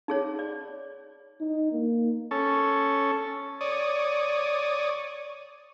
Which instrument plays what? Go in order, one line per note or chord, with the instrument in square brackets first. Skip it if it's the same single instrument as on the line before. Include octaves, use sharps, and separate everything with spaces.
[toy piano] D#4 G#4 C#5
D5
[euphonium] D#4
A#3
[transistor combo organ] C#4 A4
C#5 D5 D#6